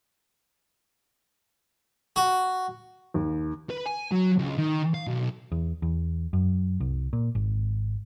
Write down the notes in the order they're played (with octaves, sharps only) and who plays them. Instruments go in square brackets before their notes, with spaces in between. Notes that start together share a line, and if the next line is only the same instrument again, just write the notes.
[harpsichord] F#4
[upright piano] D#2
[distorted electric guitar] B4
G#5
F#3
C#2
D#3
F5
B1
[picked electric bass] E2
E2
F#2
C2
A#2
G#1